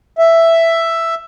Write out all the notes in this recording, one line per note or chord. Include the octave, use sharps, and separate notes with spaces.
E5